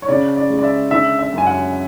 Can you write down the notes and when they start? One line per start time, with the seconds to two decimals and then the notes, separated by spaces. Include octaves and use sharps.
0.02 C#5
0.08 C#3 D5
0.36 D5
0.50 G#3
0.59 D5
0.63 E5
0.91 D3 E5
1.19 E5
1.32 F#2
1.38 G#5
1.46 F#5